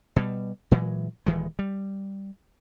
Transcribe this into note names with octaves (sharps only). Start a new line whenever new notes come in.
B2 G3
A#2 E3 F#3 G#3
D#1 D#3 E3 G#3
G3